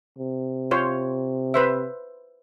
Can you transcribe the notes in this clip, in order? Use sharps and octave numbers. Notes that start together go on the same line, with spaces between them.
C3
F4 C5 C#5
B4 C5 E5